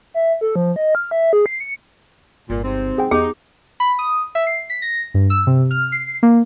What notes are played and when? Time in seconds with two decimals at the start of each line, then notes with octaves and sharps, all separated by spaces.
0.14 E5
0.41 A4
0.56 F3
0.76 D#5
0.95 F6
1.11 E5
1.33 G#4
1.46 C7
1.60 C#7
2.50 G1 A#2
2.64 G#2 C3 C4
2.98 F#3 G#4 F#5 G5
3.11 E2 B3 D#4 G4 G#4 D6
3.80 B5
3.99 D#6
4.35 E5
4.47 C7
4.70 B6
4.82 A#6
5.14 G2
5.30 E6
5.47 C3
5.71 F6
5.92 C7
6.23 A#3